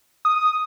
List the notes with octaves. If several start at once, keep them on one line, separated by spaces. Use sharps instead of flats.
D#6